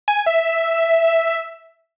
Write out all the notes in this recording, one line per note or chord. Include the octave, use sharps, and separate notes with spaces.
G#5
E5